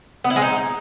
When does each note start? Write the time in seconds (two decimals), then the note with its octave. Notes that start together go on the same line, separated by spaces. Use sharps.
0.24 B3
0.30 E4
0.36 G#3
0.42 D#4